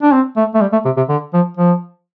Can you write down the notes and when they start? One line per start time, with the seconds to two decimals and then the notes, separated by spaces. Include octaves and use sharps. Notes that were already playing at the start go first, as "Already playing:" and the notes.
0.02 D4
0.13 C4
0.36 A3
0.54 A3
0.61 G3
0.72 A3
0.85 C3
0.97 C3
1.09 D3
1.33 F3
1.57 F3